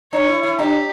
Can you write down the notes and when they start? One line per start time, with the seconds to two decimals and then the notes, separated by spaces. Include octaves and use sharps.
0.13 D4 C#5
0.28 E4
0.43 E4
0.59 D4 G4